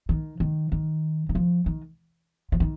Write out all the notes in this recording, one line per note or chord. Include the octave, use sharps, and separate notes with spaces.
D#3
D#3
D#3
D#3
F3
D#3
F3
D#3